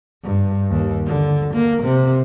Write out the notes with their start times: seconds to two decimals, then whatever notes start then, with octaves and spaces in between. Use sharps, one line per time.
0.24 G2
0.71 D#2
1.06 D3
1.54 A#3
1.84 C3